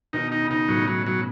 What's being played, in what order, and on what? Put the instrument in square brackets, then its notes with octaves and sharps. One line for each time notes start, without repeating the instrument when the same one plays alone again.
[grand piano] B2 D#3 [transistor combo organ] D#4
[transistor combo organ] D#4
[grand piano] C#3
[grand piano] B2 [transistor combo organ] D#4
[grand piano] A2 C#3 [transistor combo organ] F#3
[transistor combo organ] F#3
[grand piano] B2 [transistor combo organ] F#3